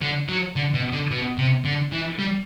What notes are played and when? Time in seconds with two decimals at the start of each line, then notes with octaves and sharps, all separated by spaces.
0.02 D3
0.29 F#3
0.56 D3
0.74 B2
0.92 D3
1.11 B2
1.38 C3
1.65 D3
1.92 E3
2.19 G3